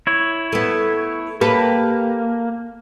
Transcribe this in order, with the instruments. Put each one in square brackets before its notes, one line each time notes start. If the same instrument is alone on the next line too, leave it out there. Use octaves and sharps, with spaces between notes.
[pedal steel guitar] E4 C#5
[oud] A3 B3
[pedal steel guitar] A#3 [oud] G4 A4 B4